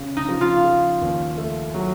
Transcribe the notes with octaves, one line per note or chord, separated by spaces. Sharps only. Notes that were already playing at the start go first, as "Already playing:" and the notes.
Already playing: C#3
D#4
F3
F4
F3
D#2
A3
F#3